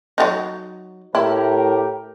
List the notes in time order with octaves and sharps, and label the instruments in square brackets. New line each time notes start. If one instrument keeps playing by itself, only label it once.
[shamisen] F#3 D4 D#4
[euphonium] A2 [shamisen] E4 [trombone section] G4 A#4